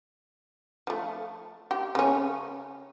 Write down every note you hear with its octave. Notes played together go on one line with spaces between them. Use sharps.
F3 A3
G4
C#3 C#4